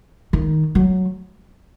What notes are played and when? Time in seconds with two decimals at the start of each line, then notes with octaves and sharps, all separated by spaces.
0.33 D#3
0.75 F#3